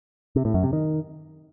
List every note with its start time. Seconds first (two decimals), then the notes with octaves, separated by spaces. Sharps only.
0.36 C3
0.45 A2
0.54 F#2
0.63 C3
0.73 D#3